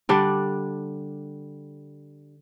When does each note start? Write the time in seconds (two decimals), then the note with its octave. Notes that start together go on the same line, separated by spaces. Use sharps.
0.09 D3 G3 D4